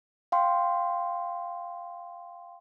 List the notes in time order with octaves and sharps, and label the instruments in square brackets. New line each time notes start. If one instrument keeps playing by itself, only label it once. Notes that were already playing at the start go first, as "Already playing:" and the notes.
[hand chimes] F5 G5 C6